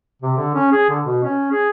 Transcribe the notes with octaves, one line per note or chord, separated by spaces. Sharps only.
C3
D3
C#4
G#4
D3
B2
C#4
G#4